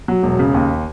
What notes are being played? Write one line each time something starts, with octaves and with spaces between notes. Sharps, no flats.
F#3
E1
C#3
D#2